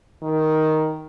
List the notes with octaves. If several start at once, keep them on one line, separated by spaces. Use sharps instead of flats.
D#3